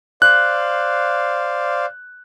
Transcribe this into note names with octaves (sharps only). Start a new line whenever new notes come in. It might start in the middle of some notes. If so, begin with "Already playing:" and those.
C5 D5 F5 F#6